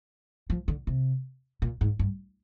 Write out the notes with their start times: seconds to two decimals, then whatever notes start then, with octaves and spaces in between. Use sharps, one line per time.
0.50 F3
0.68 D3
0.87 C3
1.62 A#2
1.81 G#2
1.99 G2